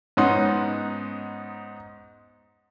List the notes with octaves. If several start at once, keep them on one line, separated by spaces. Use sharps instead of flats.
G#2 B3 C#4 D#4 F#5 C6